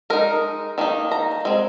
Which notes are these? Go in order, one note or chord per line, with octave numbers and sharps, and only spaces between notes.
G#3 D#4 A#4
D#3 A#3 D#4
A#5
G#3 C4